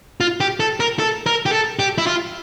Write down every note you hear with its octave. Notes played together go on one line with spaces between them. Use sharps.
F4
G4
A4
A#4
A4
A#4
G4
A4
G4
E4
F4